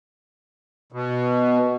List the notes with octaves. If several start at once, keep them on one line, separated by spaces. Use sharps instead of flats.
B2